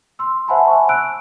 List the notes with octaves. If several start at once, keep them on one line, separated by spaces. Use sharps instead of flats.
C6 E6
C5 E5 F#5 G#5 A5 B5
G#5 C#6
E6 F#6 D7